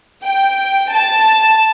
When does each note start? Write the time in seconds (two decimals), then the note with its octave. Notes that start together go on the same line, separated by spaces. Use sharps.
0.24 G5
0.92 A5